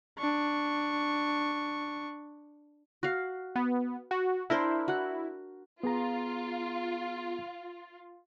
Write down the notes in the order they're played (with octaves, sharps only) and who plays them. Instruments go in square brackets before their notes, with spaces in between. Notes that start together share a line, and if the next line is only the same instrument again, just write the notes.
[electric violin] D4 C#6
[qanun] F#4 F5
[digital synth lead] B3
F#4
[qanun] D4 A#4 C5 [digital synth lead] E4
[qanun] F#4 F#5
[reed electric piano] B3 G#4 A#5 [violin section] F4